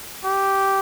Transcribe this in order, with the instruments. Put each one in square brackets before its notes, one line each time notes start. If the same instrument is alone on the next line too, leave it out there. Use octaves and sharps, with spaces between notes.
[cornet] G4